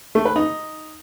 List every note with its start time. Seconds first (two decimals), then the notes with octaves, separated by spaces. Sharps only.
0.15 A3
0.25 B4
0.36 D#4